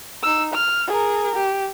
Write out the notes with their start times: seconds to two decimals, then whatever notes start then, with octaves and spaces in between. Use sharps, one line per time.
0.23 D#4 E6
0.53 F6
0.87 G#4 A#4
1.36 G4